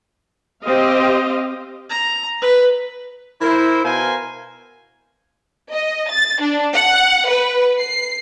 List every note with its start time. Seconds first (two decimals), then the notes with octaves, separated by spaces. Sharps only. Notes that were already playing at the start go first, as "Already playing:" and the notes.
0.63 C4 G4 C5 D#5 F5
1.90 A#5
2.41 B4
3.42 E4 A#4 C5
3.84 B2 A#4 C5 F5 G#5 C6
5.72 D#5
6.10 A6
6.41 D4
6.75 F#5
7.29 B4
7.80 C7